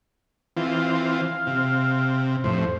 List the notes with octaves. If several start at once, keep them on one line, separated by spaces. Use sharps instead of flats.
E3 C4 F4
F5
C3
F2 A2 C5